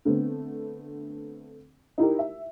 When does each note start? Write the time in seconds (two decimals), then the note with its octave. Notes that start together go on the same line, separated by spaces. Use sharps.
0.05 D3 A3 B3 C4
1.98 D#4 E4 G4 A#4
2.19 E5